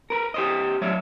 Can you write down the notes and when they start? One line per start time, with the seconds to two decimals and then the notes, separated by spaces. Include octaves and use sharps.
0.10 A#4 B4
0.34 G4 C5 D#5
0.81 F#3 A3 C#5 D5 E5